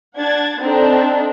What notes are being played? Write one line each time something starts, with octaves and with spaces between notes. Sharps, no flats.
D4 F#5 G#6 A6
C4 D4 D#4 A4